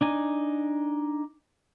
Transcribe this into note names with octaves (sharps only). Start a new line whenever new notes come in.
D4 D#4 G#5